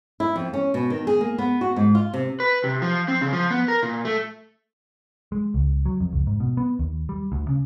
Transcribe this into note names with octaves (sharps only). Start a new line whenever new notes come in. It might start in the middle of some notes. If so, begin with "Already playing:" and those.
E4
F2
C#4
B2
D#3
G#4
A#3
B3
F#4
G#2
F4
C3
B4
C3
F3
C4
C#3
F3
B3
A#4
A#2
A3
G#3
C#2
F#3
F2
C#2
G#2
B2
B3
D#2
G3
D2
C#3